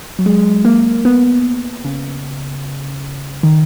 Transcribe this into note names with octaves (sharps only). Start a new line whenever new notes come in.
F#3
G#3
A#3
B3
C#3
D#3